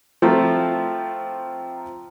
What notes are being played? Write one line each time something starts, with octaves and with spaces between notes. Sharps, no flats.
F3 A3 C4 G5 A#5